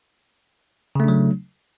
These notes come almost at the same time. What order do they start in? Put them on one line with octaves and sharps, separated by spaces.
C#3 A3 D4 F#3